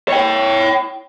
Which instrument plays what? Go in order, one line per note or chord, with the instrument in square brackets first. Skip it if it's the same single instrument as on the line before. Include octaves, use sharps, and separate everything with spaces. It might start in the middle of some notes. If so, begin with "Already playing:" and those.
[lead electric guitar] C#5 G5